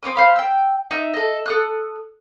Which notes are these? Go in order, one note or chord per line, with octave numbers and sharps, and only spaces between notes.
C4 C#4 D6 D#6
C5 F5 B5
G5 E6
D#4 E5
A4 D#5
A4 D#6 F#6